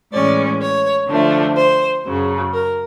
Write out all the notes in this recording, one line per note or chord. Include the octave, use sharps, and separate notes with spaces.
A2 E3 G#3 C#4 D5
C#5
D3 F3 A3 D4
C5
F#2 C#3 F#3
A#4